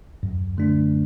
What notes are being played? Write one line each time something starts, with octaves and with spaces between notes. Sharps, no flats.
F#2
D3 A3 D4